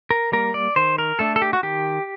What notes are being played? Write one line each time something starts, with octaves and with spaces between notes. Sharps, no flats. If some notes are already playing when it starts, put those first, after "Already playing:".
A#4
G3 A#3 A#4
D5
D#3 C5
A#4
A3 D4 A4
A4
G4
F#4
D#3 G4